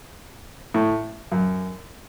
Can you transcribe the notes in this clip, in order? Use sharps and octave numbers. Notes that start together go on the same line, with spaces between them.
A2
F#2